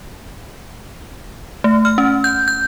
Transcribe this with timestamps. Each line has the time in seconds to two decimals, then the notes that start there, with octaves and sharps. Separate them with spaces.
1.64 A3
1.85 F6
1.98 C#4
2.24 G6
2.48 G6